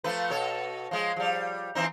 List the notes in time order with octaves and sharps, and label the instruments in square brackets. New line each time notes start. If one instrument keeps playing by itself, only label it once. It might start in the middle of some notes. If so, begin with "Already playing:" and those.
[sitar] F3 A3 B4
B2 A4 C#5
F3 G#3
F3 G3
E3 C4 D#4